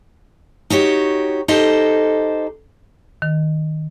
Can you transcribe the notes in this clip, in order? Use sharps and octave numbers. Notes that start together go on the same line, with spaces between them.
D#4 F#4 G4 C#5
D#4 G4 A4 C5 D#5
D#3